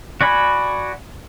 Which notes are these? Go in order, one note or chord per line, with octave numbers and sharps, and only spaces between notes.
F#4 D5 G#5 B5